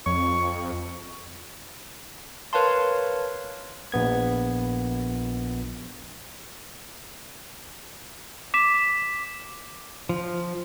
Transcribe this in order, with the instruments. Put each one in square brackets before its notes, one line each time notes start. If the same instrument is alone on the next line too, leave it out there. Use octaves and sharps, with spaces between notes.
[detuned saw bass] F2 [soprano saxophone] C#6
[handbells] A#4 B4 C#5 F5 A5 C6
[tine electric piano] A#1 B3 G#6
[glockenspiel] D6 B6 E7
[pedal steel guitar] F3